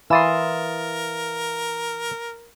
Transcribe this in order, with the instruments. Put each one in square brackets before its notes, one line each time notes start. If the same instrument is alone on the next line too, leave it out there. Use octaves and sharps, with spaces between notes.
[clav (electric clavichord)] E3 [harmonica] A#4 [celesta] E5 F5 A6 [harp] C6 D#6 E6